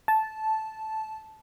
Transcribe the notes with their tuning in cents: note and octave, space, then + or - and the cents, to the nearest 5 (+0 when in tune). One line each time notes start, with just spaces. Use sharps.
A5 -10